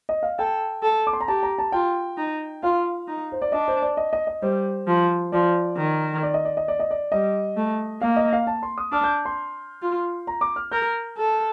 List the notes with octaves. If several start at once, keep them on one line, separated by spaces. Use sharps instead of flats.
D#5
F5
A4 G5
A4
D6
C6
A#5
G4 A5
A#5
A5
F4 G5
D#4
F4 F5
D#4
C5
D5
D4 D#5
C5
D5
D#5
D#5
D#5
G3 C5
F3
F3 D5
D#3
D5
D#5
D5
D#5
D5
D#5
D5
G3 D#5
A3
A#3 F5
D#5
F5
A5
C6
D#6
D4 F6
G6
C6
F4
A#5
D6
F6
A#4 G6
A4